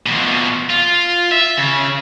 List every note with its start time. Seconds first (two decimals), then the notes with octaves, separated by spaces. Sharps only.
0.06 B2 F3
0.70 F4
1.31 E5
1.57 C#3